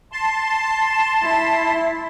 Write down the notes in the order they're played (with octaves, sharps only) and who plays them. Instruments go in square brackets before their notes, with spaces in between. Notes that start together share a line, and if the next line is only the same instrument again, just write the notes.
[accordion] A5 C6
[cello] E4